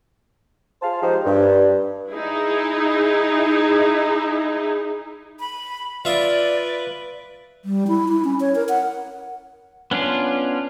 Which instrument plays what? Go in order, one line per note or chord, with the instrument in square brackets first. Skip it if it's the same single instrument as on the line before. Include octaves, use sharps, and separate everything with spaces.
[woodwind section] F4 G#4 C5 F5 A5
F3 G#3 D#4 G4 C5
G2
[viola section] D#4 E4 G#4
[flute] B5
[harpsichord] F4 E5 D#6 [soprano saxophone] B4 [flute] D5
[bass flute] G3
E4
E4
C#4
C#5
A#4
F#5
[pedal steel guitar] B3 C#4 D4 F4